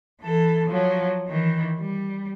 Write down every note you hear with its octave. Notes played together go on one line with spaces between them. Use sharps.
E3 A4
F3 F#3
D#3 E3
G3